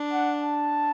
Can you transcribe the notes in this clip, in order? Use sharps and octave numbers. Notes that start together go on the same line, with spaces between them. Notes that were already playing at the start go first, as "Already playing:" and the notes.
Already playing: D4
F#5
A5